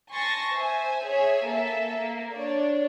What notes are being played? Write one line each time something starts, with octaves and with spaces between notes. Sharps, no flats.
G#5 A5 C6 C#6 A6 A#6
C5 E5 G#5
G#4 C#5 E5 G#5
A#3 A4 E5
A#3
D4 C#5 D5